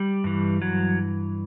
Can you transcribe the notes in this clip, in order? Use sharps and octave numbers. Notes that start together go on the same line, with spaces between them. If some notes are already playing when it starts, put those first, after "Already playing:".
Already playing: G3
G2 E3
F#3